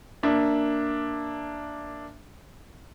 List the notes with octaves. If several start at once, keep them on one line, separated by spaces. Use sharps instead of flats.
A#3 D4 E5